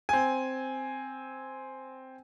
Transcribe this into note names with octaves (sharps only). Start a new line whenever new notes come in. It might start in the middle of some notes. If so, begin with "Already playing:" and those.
C4 G#5